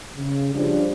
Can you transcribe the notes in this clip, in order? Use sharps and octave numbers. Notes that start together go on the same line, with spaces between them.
C#3
F3 G3 D4